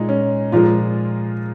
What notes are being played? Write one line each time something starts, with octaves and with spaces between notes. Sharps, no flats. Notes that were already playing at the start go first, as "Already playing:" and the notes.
Already playing: A#2 G#3 D#4
C#4
A#2 F3 G#3 F4